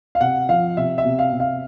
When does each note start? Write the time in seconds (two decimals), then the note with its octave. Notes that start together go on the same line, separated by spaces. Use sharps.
0.15 F5
0.21 C3 F#5
0.49 F3 F5
0.77 C3 E5
0.98 E5
1.05 C3
1.19 F5
1.33 C3
1.40 F5